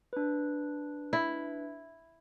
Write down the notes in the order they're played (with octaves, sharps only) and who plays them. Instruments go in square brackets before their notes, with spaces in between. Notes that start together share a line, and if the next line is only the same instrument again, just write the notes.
[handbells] D4 B4
[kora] E4